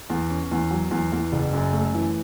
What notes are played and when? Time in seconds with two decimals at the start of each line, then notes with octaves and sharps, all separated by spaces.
0.10 E2
0.30 C#4
0.51 E2
0.71 F#3
0.91 E2
1.12 E2
1.32 F#1
1.53 F#2
1.73 A3
1.94 E3